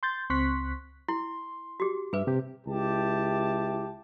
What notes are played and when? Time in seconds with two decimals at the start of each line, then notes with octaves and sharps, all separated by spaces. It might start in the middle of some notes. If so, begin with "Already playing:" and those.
0.03 C6 G6 A6
0.30 C#2 C4 C6 C#6 F#6 B6
1.08 E4 C6
1.80 F#4 G4
2.13 G2 G#4 B4 E5
2.27 C3 G4
2.67 C#2 E4 G4 A5